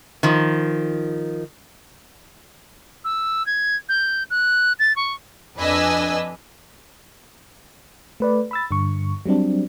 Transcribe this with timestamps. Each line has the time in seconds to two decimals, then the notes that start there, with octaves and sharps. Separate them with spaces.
0.23 D#3 F3
3.05 E6
3.46 G#6
3.89 G6
4.30 F#6
4.79 A6
4.96 C#6
5.58 F2 D4 B4 D#5 G#5 E6
8.20 A3 B4 D5
8.51 B5 E6 A6
8.71 G2 D3 C#6
9.26 F#3 G3 C4 D4